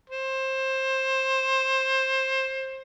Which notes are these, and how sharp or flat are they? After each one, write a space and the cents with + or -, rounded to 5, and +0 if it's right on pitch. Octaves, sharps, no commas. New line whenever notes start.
C5 +20